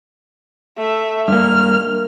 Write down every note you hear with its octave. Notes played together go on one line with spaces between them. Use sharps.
A3 E5
G2 A#3 F6